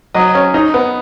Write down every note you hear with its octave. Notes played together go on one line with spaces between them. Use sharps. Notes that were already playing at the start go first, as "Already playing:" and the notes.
F#3 D#5
C#4
D#4
B3